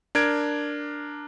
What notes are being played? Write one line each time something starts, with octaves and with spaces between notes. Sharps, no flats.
D4 A#4 G#6 D7